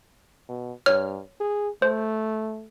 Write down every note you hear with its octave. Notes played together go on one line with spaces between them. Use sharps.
B2
G2 C#5 F6
G#4
A3 C5